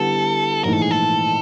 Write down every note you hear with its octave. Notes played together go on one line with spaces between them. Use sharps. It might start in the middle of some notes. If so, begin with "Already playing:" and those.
Already playing: D3 G3 B3 E4 G4 A4
A#1 G#2 E3 A3 A#4
A4
G#4
A4